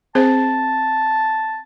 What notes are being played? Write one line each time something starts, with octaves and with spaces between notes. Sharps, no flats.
C4 G#4 C5 A5